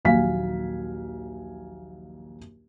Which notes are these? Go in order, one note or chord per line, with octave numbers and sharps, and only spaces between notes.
A#1 D#2 F#3 F5 G#5 B6